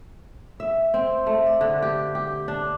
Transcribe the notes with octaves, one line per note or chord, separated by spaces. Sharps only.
E5
C4
A3
D5
D3
G4
G4
D4